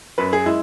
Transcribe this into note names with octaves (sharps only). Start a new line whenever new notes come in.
F#2 F#3 B4
G#4
G#3 E4